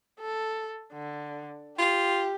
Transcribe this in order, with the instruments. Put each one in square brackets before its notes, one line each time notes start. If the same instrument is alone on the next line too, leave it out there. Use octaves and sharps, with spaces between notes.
[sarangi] A4
D3
[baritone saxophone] F4 [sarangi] G4